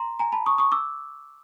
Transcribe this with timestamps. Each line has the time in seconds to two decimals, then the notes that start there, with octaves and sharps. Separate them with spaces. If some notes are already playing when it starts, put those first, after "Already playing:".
Already playing: A#5 C6
0.19 G#5 A#5
0.32 A5 B5
0.46 C#6 D#6
0.58 C#6 D#6
0.72 D6 E6